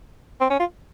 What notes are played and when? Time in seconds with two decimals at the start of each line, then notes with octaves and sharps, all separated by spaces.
0.41 C4
0.50 C#4
0.60 F4